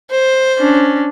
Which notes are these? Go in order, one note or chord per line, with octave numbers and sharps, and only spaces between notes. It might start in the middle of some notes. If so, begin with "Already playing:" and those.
C5
C#4 D4